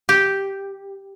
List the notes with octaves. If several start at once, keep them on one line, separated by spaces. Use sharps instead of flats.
G4